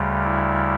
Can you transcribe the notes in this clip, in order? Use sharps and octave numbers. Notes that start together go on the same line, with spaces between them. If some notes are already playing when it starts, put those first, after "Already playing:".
Already playing: D2 C#3 G3
E4